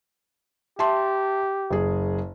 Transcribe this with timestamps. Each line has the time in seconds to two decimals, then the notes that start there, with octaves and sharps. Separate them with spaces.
0.79 G4 E5 A5 C6
1.70 F#1 G#4